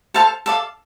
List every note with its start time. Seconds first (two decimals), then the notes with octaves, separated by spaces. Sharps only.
0.14 A4 C5 F5 A5
0.46 A4 D5 F5